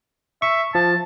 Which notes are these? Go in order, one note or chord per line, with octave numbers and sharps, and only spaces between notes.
E5 C#6
F3 A5